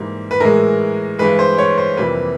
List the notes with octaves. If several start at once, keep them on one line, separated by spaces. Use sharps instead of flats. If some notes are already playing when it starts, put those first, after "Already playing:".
Already playing: G#2 E3 G3 A#3
B4
A2 E3 G#3 A#4
G2 E3 G#3 B4
C5
C#5
C5
F2 C3 E3 G3 A#3 B4